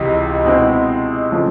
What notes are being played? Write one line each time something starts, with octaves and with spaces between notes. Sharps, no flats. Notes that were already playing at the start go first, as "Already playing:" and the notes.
Already playing: C#2 C3 E3
B2 G#3 C4 E4
C#3 F3 A3